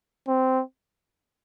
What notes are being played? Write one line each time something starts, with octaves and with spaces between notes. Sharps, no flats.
C4